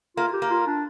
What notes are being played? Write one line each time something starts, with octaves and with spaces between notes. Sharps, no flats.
A#3 F4
G4
A#3
F4
D4